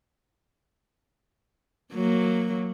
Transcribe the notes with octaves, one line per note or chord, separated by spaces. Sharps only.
F#3 A#3